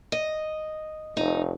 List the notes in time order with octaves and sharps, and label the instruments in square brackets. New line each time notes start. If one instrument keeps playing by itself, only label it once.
[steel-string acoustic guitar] D#5
[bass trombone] F1 [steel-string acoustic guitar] D#4